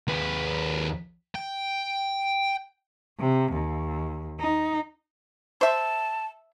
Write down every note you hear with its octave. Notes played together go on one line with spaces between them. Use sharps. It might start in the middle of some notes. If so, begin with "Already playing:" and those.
D#2 B4
G5
C3
D#2
D#4
C5 E5 A5